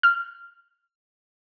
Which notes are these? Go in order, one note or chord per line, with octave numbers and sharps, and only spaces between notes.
F6